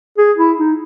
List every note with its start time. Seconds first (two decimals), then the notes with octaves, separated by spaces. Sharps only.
0.18 G#4
0.38 E4
0.58 D#4